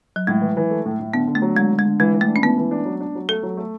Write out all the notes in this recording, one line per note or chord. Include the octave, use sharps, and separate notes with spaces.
F#3
A2 G#3
E3
E3
A3
A2
A2
D3 B3
D3
A3
F#3
D3 G#3
D3
G#3
D3
E3 G#3
E3
A3
D4
C#4
E3 B3
E3
D4
F#3
D4
F#3
A3 A4
F#3
A3